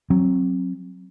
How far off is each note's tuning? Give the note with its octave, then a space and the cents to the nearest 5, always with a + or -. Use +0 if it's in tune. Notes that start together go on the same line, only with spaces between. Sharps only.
F#3 +0 C4 +30